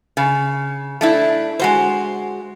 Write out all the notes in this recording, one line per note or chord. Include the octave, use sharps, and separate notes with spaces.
C#3
A3 D4 E4
G#3 F#4 C5